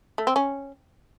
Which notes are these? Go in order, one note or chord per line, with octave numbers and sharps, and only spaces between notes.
A3
C4
C#4